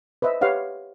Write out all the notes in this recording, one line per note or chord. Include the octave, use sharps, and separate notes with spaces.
B4 C5 D#5 E5
G4 B4 C#5 F5 F#5